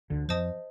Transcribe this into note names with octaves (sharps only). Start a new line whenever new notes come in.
D2 D3
F2 F3 C5 D#5 A5 D#6